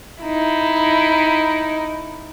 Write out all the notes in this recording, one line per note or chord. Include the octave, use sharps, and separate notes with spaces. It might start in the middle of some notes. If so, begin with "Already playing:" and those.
D#4 E4